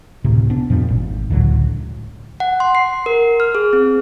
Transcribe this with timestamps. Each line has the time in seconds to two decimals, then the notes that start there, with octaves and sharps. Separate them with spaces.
0.24 D2 A2 C3
0.50 B3 D4
0.70 F2 A#2 F3 G3
0.89 G#1
1.30 C#2 A2 D3 F#3
2.40 F#5
2.60 C6
2.75 C7
3.06 A#4
3.40 F6
3.55 G#4
3.73 C4